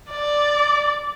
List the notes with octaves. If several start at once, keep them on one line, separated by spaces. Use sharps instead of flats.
D5